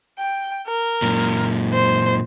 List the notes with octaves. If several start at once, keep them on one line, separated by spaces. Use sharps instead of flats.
G5
A#4
F#2 A#2
C5